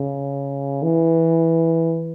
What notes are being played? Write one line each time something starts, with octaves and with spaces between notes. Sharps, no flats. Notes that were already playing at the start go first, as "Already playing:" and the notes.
Already playing: C#3
E3